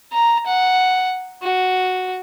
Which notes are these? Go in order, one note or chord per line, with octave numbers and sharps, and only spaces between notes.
A#5
F#5
F#4